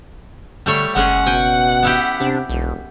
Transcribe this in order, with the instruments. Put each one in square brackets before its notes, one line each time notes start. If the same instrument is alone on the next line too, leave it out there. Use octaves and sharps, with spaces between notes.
[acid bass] D3 [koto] G3 A3 C#5
[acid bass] F#1 [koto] G#3 C#4 G#4 [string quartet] F#5
[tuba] B2 [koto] G5 G#5
[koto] B3 E4 G4
[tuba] C3 [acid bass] D4
[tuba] E1 [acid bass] B1